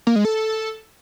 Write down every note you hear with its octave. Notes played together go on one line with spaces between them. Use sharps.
A#3
G#3
A4